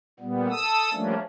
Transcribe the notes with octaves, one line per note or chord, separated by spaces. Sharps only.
A#2 G3 B3
A4 D#6 E6
F3 G3 A3 A#3 C#4 D4